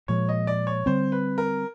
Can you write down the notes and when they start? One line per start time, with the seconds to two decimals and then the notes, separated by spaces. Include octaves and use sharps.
0.08 A#2 F3 G#3 C#5
0.29 D#5
0.47 D5
0.67 C#5
0.86 D3 G3 C4 C5
1.12 B4
1.38 A#4